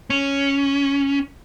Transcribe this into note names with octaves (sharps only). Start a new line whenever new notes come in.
C#4